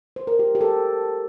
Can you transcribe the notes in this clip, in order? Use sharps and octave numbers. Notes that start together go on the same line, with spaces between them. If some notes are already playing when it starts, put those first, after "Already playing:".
C5
A#4
G4
G4
A4